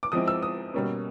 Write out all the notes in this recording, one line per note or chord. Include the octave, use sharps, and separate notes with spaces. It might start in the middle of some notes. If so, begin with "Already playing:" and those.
D6
F3 G#3 C4 E4 D#6
E6
D#6
B2 G3 A#3 C#4